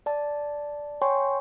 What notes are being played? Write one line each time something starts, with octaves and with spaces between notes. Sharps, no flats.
D5 A5
C#5 G5 G#5 C6 C#6